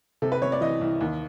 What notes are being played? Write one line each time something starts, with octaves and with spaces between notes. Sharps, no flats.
C3 A4
B4
C3 C#5
D5
E3 D#5
C2
D#2